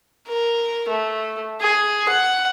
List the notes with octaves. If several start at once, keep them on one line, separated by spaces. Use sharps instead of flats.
A#4
A3
G#4
F#5